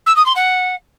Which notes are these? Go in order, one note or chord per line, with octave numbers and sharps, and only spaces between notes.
E6
D#6
C6
F#5